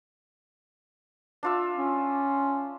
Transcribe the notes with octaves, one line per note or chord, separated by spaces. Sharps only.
D4 F4 E5
C#4